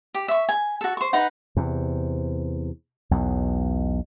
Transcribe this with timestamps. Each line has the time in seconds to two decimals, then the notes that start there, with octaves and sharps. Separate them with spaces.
0.14 G4
0.28 E5 C#6
0.49 G#5
0.81 F#4 A4
0.97 C5 C#6
1.13 D#4 B4 F#5
1.57 E2 C3
3.11 B1 E2 B2